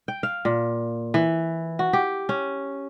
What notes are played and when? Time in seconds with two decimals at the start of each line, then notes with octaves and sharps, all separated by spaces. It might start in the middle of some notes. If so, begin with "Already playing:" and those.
0.08 G5
0.23 F5
0.45 A#2
1.14 E3
1.79 F#4
1.93 G4
2.29 C#4